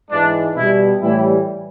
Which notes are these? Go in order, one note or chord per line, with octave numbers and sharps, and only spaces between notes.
G#2 E3 G#3 D4
B2 G3 E4
A2 E3 G3 E4